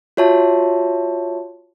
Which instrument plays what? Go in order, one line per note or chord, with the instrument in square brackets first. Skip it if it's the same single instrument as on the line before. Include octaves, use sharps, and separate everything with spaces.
[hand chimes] F4 F#4 C#5 E5 A5 C6